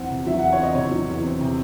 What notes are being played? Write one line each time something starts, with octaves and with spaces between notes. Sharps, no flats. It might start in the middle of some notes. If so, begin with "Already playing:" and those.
Already playing: E2 C4 F#5
C3
F#3 E5
E2 F#5
C#5
C4 D#5
C3 C#5
F#3
E2
C4
C3